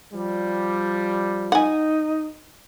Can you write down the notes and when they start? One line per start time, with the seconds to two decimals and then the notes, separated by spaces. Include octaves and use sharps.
0.13 F3 G3
1.52 D#4 F#5 G#5